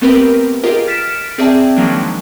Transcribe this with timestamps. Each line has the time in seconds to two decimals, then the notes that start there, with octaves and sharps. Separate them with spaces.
0.01 A3 B3 C4 G4 A#4 B4
0.64 F4 G4 G#4 A#4 D#5
0.87 F6 A6 B6 C#7 D7 E7
1.38 C4 G#4 D5 E5 G5 A5
1.76 D#3 F3 F#3 G#3 A#3 D4